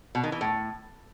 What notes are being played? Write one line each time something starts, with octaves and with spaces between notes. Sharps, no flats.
B2
D#3
E3
A2